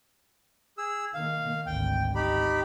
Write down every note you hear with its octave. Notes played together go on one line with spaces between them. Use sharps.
G#4 E6
D#3 A#3 F5
G#1 D2 G5
D#4 G4 B5